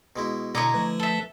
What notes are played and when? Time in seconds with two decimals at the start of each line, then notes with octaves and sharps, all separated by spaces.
0.16 B2 G#3 E4
0.55 B2 D3 E4 C#5 D#5 A#5 D6
0.74 F3 A3 B4
1.00 A4 E5